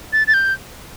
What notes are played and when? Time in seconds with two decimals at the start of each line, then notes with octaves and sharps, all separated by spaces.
0.13 A6
0.27 A6
0.34 G6